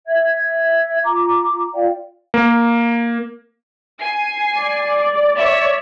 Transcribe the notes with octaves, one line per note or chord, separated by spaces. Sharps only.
E5 G#6
F4 A#5 D6
F4 D5 F5 G5
A#3
G#5 C7
D5
C#5 E5